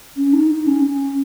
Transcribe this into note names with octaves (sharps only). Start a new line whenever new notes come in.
C#4
D#4
D#4
C#4
C#4